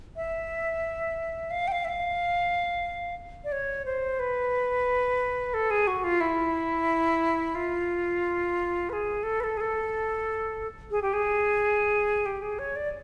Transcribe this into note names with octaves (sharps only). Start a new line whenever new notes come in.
E5
F5
G5
F5
E5
F5
D5
C#5
C5
B4
A4
G#4
F#4
F4
E4
F4
B4
G#4
A4
B4
A4
G#4
A4
G#4
G4
G#4
G4
G#4
C#5
D5